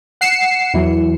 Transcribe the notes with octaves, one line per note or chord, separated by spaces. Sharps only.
F#5 C7 C#7 E7
E2 E3 F#3